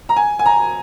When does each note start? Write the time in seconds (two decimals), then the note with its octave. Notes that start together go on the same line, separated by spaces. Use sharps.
0.09 A#5
0.16 G#5
0.39 G#5
0.46 A#5